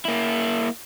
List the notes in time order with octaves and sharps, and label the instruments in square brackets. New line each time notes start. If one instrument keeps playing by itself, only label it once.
[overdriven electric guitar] A#3 E4